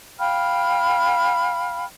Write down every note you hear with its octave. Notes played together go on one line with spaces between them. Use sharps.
F5 G5 B5 F6